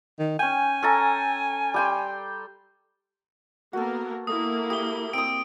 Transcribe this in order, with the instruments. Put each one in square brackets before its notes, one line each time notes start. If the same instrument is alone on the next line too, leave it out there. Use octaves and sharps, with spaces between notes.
[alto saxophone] D#3
[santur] C#4 G5 [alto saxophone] G#5
[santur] C#4 A4 A#5
G3 G5 C6
[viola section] A#3 B3 A#4 [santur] F#4 A4
[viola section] A#3 E4 [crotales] D#6
[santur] G4 [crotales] D#6 G7
[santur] C4 D#6 [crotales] D7